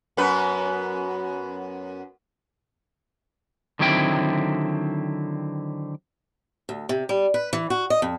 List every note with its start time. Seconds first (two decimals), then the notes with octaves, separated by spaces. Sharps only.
0.17 F#2 B3 B4
3.79 D3 D#3 F#3 C4 E4 G5
6.69 D2
6.89 C3
7.09 G3
7.34 B4
7.53 E3
7.70 F#4
7.90 D#5
8.02 F2